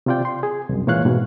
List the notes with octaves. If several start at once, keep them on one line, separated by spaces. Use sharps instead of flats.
C3 C4 F4 D5 G5
C6
G#4
C2 F#2
A#2 E3 G#3 C#5 F5 F#6
G#2 B2